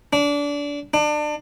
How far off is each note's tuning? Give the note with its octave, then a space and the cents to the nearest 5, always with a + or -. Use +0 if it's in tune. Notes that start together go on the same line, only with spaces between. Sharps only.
D4 -25
D4 +30